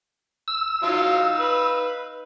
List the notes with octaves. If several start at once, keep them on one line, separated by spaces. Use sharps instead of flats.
E6
F#3 D#4 F4 F5
B4